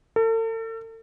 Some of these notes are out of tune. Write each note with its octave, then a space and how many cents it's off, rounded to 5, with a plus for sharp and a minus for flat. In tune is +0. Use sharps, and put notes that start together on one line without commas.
A4 +40